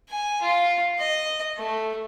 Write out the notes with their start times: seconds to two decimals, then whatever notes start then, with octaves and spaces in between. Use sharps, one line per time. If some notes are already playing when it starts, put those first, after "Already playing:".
0.10 G#5
0.42 F4
0.98 D#5
1.58 A3